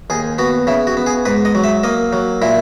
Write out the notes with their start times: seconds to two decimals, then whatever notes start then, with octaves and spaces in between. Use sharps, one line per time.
0.10 D#2 G#4
0.38 B3 F#4
0.67 C#3 E4
0.87 F#4
0.97 B3
1.06 G#4
1.25 G#2 B4
1.45 D#5
1.55 F#3
1.64 E5
1.83 A#3 D#5
2.13 F#3
2.42 A#2 E4